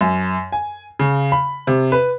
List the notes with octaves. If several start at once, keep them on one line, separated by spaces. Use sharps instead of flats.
F#2
G#5
C#3
B5
C3
B4